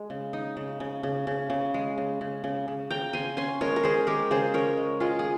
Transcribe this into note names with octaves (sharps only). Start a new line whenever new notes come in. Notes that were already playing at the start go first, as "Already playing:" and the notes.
Already playing: G#3
C#3
D#4
C#3
C#3
C#3
C#3
C#3
G#3
C#3
C#3
C#3
C#3
C#3 G5 A#5
C#3 G#5 C6
C#4 G#5 C6
G#3 A#4 C#5
A#4
C#4 G#4 C5
G#3 G4 A#4
C#3 G#4 C5
C#4 A#4 C#5
G#3
G#3 F4 G#4
G#4